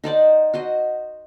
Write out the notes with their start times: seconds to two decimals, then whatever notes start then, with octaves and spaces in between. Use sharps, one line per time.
0.04 D#4 C5 D5 F#5
0.54 F#4 C5 D#5